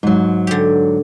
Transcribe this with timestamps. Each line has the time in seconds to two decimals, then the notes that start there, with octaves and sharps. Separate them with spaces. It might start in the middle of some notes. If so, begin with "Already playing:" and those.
0.03 G#2 F#3
0.47 D3 G4